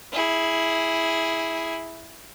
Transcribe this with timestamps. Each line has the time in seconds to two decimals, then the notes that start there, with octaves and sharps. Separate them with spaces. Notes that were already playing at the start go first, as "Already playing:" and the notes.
0.12 E4 G#4